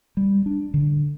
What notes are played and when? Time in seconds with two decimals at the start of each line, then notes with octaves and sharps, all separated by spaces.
0.17 G3
0.46 D4
0.74 D3